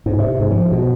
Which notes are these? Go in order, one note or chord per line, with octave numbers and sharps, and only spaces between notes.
G#2
C3
G#2
F3
B2